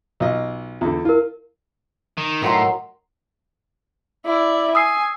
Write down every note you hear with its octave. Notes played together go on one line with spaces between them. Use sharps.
B1 F4 D#5
E2 D3 F4
E4 F4 A#4
D#3
A2 D#3 F#3 C6
E4 D5
G#5 D#6 E6 C7